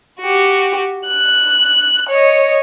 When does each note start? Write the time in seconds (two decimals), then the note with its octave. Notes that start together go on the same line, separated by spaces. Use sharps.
0.21 F#4 G4
1.08 F#6
2.09 C#5 D#5